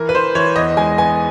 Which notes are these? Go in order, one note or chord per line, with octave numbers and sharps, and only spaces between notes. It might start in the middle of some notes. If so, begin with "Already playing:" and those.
Already playing: E3 A#4
B4
E3 C5
E3 C#5
E2 D#5
G#3 G#5
B3 G#5